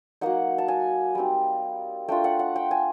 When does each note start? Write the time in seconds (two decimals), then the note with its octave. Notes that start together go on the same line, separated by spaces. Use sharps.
0.21 F#3 A#3 D#4 F#5
0.58 A5
0.68 G#5
1.15 G3 C4 D#4
2.08 A3 D4 F4 G5
2.24 F#5
2.39 F#5
2.56 G5
2.71 G#5